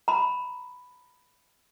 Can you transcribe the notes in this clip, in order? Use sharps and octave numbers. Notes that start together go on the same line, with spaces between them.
A#5 B5